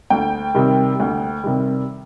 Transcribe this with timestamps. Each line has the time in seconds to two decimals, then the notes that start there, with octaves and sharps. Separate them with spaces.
0.10 D2 G5
0.54 C3 D#3 G3
1.00 D2
1.44 C3 D#3 G3